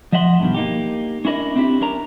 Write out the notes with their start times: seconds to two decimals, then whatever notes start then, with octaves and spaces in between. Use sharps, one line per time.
0.12 F3 D#5 E5 F#5 C6
0.40 G2 B2 D#3
0.54 A#3 D#4 G4
1.25 C#4 D4 E4 A#4 D#5
1.56 C4 D4 E4 F4 G4
1.81 C#4 D4 A#4 A#5